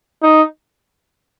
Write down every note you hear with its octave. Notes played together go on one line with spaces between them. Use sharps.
D#4